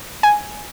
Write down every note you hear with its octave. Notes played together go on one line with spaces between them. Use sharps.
G#5